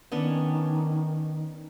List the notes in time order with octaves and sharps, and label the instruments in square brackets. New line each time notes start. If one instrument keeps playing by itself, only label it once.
[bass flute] D#3 [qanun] B3 C#4 D4